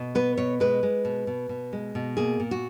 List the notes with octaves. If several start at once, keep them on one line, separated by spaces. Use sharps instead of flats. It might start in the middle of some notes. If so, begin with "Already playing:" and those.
Already playing: B2
B3 B4
B2 C#5
G#3 B4
G#3
B2
B2
B2
G#3
B2
A#3 G#4
A#2
F#4